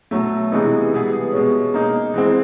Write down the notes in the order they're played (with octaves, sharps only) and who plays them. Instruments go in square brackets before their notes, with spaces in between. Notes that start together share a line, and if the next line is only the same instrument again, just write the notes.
[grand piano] B2 F#3 A3
C3 E3 G#3 B3 D#4
B2 G3 B3 E4 G#4
B2 G#3 C#4
A#3 D#4 G#4
E3 G#3 C4